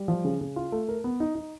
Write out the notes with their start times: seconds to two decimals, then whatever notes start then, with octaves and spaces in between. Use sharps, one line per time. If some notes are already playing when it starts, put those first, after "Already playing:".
Already playing: G3
0.08 F3
0.25 C#3
0.41 C#3
0.56 F4
0.72 A3
0.89 A#4
1.04 B3
1.20 D#4
1.35 D#4